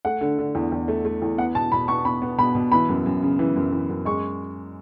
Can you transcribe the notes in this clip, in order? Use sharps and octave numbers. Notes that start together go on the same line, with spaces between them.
A3 F#5
D3
D3
E2
E2
A3
A3
E2
B3 F#5
B2 A5
B2 B5
B3 C#6
B3 B5
B3
B2 B5
B2
E3 B5
F#2
F#2
C#3
E3
F#2
E3
F#2
G#3 C#6